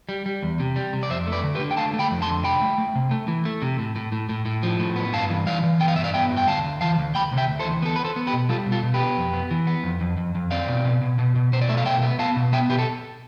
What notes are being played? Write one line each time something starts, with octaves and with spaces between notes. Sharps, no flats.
G3
G3
E2
C3
G3
C3
D5
F2 C5 E5
A3
B4 D5
D3
G4 B4
D3
G5
A3 F5 A5
A3
G5 B5
F2
A5 C6
D3
C2 G5 B5
A3
A3
C3
A3
E3
A3
C3
A2
A2
A2
A2
A2
F3
A2
B3
G2 F5 A5
E3
E3 D5 F5
E3
B3 G5
F5
G2 E5
D5 F5
B3 E5 G5
G2
G5
D2 F5 A5
D2
E3 F5 A5
D2
D2 G5 B5
C3
E5 G5
D2
A4 C5
E3
B3 A4
B4
B3
A4 C5
B3
G4 B4
B2
G3 F4 A4
B2
F4 A4
B2
G4 B4
B3
F2
B3
E3
B3
F2
F2
F2
F2
C4 D5 F5
B2
B2
B2
B2
B2
B2 C5
D5
A3 E5
F5
B2 E5 G5
B3
B3 F5 A5
B2
B3 E5 G5
B2 G4 B4
A4